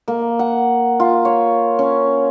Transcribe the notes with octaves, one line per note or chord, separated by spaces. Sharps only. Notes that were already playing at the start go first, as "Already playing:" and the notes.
A#3
F#5
F4
C#5
C#4